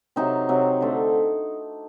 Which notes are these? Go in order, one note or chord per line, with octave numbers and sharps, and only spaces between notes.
C3 F#3 C4 D#4
C3 F#3 C4
D3 A3 C4